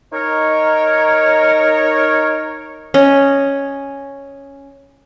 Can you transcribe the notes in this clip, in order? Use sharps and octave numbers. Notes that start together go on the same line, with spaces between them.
D#4 A#4 C#5
C#4 D#5